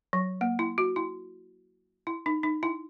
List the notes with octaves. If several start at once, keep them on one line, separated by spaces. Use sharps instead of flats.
F#3
A#3
E4
F#4
E4
E4
D#4
D#4
E4